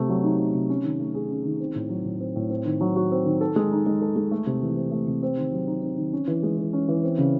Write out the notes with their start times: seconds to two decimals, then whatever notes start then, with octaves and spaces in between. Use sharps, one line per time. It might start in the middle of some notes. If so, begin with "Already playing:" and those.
Already playing: C3 A3
0.09 F#3
0.24 D#4
0.39 A3
0.54 C3
0.70 C#4
0.84 D#3
0.99 A3
1.15 G#4
1.30 C#4
1.45 D#3
1.60 C4
1.75 A2
1.89 F#3
2.05 A2
2.20 C4
2.36 A2
2.50 C4
2.65 D#3
2.81 F#3
2.96 F#4
3.11 C4
3.25 D#3
3.41 A4
3.56 G#3
3.72 D#4
3.86 G#3
4.01 A4
4.16 G#3
4.31 A3
4.46 C3
4.62 E3
4.77 C4
4.91 A3
5.07 C3
5.23 C4
5.37 D#3
5.52 F#3
5.67 D#4
5.82 C4
5.98 D#3
6.13 C#4
6.28 E3
6.43 G#3
6.58 E3
6.73 C#4
6.88 E3
7.04 C4
7.18 C#3